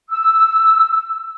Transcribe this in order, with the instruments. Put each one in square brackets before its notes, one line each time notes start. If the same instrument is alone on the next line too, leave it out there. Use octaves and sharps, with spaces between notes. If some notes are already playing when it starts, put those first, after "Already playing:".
[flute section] E6